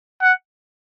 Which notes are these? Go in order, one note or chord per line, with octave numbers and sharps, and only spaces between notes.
F#5